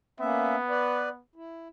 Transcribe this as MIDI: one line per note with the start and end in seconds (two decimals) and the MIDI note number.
0.20 0.56 58
0.20 1.22 59
0.20 0.56 61
0.20 0.56 76
0.69 1.09 71
0.69 1.09 74
1.35 1.68 64